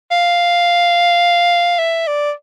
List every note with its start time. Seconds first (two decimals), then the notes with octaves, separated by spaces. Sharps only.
0.11 F5
1.79 E5
2.07 D5